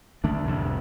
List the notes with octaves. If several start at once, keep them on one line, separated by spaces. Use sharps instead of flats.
D3 A3 D4
C2 F2 A2